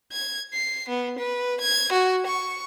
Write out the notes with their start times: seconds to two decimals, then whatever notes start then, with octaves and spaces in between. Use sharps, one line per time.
0.12 G#6
0.54 C7
0.89 B3
1.19 B4
1.61 G#6
1.92 F#4
2.27 C#6